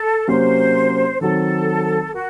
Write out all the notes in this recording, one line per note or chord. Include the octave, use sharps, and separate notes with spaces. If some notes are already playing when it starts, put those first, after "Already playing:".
Already playing: A4
C3 F#3 A#3 C#4 C5
D#3 F#3 C4 A4
F#4 A#4